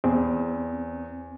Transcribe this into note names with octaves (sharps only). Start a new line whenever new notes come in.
E2 C4